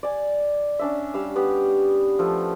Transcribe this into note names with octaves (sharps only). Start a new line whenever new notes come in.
D5 G#5
C#4 D4 E5
G3 F5 E6
B3 G4
F3 A3